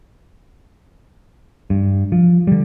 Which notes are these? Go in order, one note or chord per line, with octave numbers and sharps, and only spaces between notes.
G2
F3
D3 G3